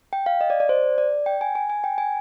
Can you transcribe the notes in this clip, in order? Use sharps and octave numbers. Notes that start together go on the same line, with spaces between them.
G5
F5
D#5
D5
D5
C5
D5
G5
G#5
G#5
G#5
G5
G#5